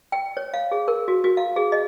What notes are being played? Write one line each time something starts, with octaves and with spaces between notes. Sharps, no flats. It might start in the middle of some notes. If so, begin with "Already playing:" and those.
G5
C#5
F5
G#4
A#4
F#4
F#4
F5
G#4
D#5